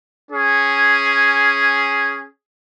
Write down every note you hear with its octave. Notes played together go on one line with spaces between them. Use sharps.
C#4 G#4